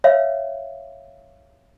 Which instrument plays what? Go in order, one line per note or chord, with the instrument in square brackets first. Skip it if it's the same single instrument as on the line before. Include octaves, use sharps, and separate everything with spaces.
[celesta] C#5 E5 F5